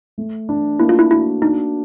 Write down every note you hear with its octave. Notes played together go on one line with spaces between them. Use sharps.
A3
D4
A#3 E4
F4
E4
E4 F#4
D4 D#4